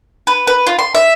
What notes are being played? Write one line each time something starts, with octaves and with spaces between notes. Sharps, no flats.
B4
B4
F4
C6
E5